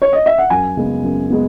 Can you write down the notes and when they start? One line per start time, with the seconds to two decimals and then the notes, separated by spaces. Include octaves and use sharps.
0.02 C#5
0.13 D#5
0.26 E5
0.38 F#5
0.50 F#2 G#5
0.77 C#3 G#3 B3
1.04 F#2
1.30 G#3 B3